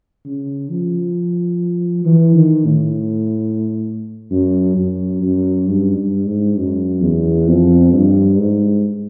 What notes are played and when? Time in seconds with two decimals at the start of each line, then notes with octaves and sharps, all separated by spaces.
0.25 C#3
0.69 F3
2.05 E3
2.35 D#3
2.65 A2
4.31 F#2
4.76 F#2
5.21 F#2
5.67 G2
5.97 G2
6.27 G#2
6.57 F#2
7.02 E2
7.47 F2
7.93 G2
8.38 G#2